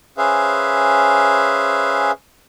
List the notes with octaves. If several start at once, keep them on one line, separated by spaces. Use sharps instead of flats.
C#4 G#4 B4 C5 E5 F5